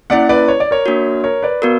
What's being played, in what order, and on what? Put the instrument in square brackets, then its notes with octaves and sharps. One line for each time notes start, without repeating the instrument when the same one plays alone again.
[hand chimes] A#3 C#4 E4 [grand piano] D5 F#5
[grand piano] B4 D5
C#5
D5
A#4 C#5
[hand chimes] A#3 D4 F#4
[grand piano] A#4 C#5
B4 D5
[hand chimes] B3 F#4 A#4